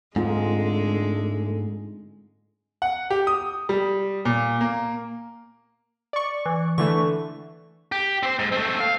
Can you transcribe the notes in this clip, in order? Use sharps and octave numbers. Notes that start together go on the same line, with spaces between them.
G#2 D3 G#3 A3 C4 D#4 F4
F#5
G4
D#6
G3
A#2
A#3
D5 C#6
E3
D3 E3 A3 C#6
G4
C4 C5
G#2
A3 C4
F5